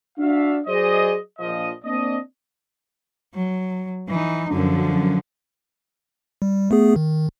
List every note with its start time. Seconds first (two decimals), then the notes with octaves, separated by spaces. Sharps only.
0.18 D4 F#4 E5 F5
0.67 F#3 G#4 C5 D5 D#5
1.39 A#1 F3 D#5
1.84 A#3 C4 D4 D5 D#5
3.34 F#3
4.09 E3 D#4
4.50 F#2 D3 F3
6.42 G3
6.71 A3 B3 G#4
6.96 D#3